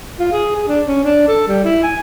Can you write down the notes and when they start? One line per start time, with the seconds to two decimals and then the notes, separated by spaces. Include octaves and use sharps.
0.20 F4
0.33 G#4
0.55 G#4
0.68 D4
0.87 C#4
1.04 D4
1.28 A4
1.48 G3
1.64 E4
1.83 G#5